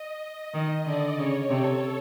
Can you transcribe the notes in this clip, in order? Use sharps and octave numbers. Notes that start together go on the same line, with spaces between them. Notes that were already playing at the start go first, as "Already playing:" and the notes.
Already playing: D#5
D#5
D#3 D#5
D3 D5
C#3 C#5
C3 A4